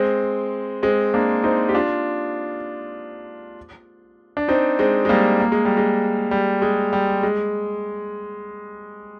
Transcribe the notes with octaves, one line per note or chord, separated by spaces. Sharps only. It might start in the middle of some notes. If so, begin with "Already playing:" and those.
Already playing: G#3 C4
G#3 C4
A#3 D4
C4 D#4
G4
D4 F4
D4
C4 D#4
G#3 C4
G#3
G3 A#3
A#3
G#3
G3
G#3
G3
G#3
G3
G#3